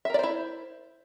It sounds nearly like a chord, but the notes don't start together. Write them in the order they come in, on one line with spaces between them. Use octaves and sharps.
E5 A#4 D5 C5 E4